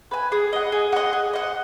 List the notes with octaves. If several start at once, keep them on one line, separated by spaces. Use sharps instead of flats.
B4 G#5
G#4
D#5 F#5
G#4
D#5 F#5
G#4
D#5 F#5